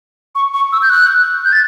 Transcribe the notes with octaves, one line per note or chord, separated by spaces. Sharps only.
C#6
C#6
E6
G6
F#6
G6
A6